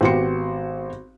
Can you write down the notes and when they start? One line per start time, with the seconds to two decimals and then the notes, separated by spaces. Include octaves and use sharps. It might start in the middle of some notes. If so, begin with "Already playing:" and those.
0.01 G#1 B3 F#4 G4 C6 C#7